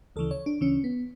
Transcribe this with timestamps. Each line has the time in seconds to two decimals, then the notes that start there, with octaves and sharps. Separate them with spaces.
0.16 D2 C#3 E3 A4
0.31 C#5
0.46 D4
0.61 D2 C#3 E3 C#4
0.84 B3